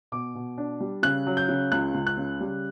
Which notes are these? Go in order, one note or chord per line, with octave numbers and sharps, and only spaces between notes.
B2 D6
B2
D4
G3
C#3 F#6
F#3
G6
C#3
C#2 F#6
C#2
F#6
C#3
G3